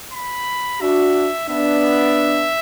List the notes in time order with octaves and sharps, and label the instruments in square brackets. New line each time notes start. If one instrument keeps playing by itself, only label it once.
[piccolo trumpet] B5
[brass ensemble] D4 F#4 [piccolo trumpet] E5
[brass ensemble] B3 D4 [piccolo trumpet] E5